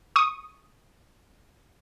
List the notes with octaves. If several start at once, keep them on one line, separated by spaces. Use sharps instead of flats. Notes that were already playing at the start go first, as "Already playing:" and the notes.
C#6 D#6